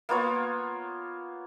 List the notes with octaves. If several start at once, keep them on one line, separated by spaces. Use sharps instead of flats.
A#3 B3 F4 C#5